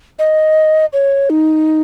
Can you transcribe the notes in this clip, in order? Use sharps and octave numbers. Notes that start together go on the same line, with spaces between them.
D#5
C#5
D#4